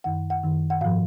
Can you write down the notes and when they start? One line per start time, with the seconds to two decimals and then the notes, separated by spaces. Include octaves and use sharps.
0.04 F#2 D#3 F#5
0.30 F#5
0.43 F#2 D#3
0.70 F#5
0.81 G#2 F3 F5